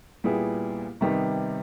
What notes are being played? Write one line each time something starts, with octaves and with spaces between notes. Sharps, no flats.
A#2 G3 B3 E4 G#4
C3 D#3 G3 B3 D#4